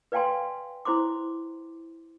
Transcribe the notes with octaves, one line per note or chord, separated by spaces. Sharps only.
B4 D5 F5 G5 G#5 C6
E4 C5 C6 D6